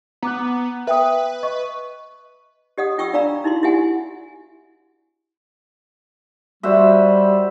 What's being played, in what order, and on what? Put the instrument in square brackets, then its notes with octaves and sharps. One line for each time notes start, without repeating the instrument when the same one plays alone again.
[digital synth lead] B3 [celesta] A#5 D6 F#6
[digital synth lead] B4 [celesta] E5 G5 D#6
[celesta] D#5 C#6
[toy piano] G4 D#5 F#5 D#6
F4 G5 C#6 E6
D4 D5 F5 A#5 B5 E6
D#4 E4 F#4 C6
E4 F#4 G4 E5 F#5 G#5
[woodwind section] G3 [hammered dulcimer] F#4 C5 E5